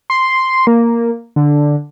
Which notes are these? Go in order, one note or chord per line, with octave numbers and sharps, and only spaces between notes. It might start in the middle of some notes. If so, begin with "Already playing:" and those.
C6
A#3
D3